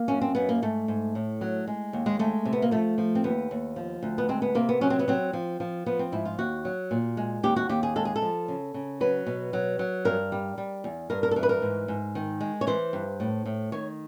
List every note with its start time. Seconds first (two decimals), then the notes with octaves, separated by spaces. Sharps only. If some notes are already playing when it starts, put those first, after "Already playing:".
Already playing: A#3
0.08 F#2 C#4
0.21 C4
0.35 F#2 B3
0.49 A#3
0.62 G#2 A3
0.88 G#2
1.15 A2
1.41 F#3
1.67 G#3
1.93 D#2
2.06 G#3
2.19 G#3 A3
2.45 C3
2.53 B3
2.62 A#3
2.71 F3 A3
2.98 F3
3.15 C4
3.24 D#2 B3
3.51 D#2
3.76 F3
4.03 D2
4.18 B3
4.29 G#3 C4
4.42 B3
4.55 C3 A#3
4.69 B3
4.81 F#3 C#4
4.90 C4
4.99 B3
5.08 F#3 C4
5.33 F3
5.60 F3
5.86 F3 B3
5.99 C4
6.12 G#2 E4
6.25 F4
6.38 D#2 F#4
6.65 F#3
6.91 A#2
7.17 G#3
7.43 D#2 G4
7.56 F#4
7.69 D#2 G4
7.83 G#4
7.96 G#3 A4
8.05 G#4
8.16 A4
8.22 F3
8.48 C#3
8.74 C#3
9.01 F#3 B4
9.27 B2
9.53 F#3
9.79 F#3
10.05 G2 A#4
10.32 G3
10.58 G3
10.84 E2
11.10 G2 A#4
11.23 A#4
11.31 A4
11.36 E3 A#4
11.43 B4
11.49 A#4
11.62 G#2
11.88 G#2
12.15 D#3
12.40 G#3
12.61 C#5
12.67 E3 C5
12.93 G2
13.20 A2
13.46 A2
13.72 D#3 C#5